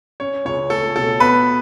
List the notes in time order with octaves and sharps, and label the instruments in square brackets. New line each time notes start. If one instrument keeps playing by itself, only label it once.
[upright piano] C#4 [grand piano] C#5
[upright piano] C#2 [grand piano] C#5
[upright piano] A3 [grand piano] A4
[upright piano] B2 [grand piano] A4
[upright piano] B3 [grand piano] B4